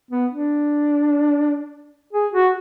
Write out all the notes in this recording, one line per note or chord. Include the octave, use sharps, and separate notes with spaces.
B3
D4
G#4
F#4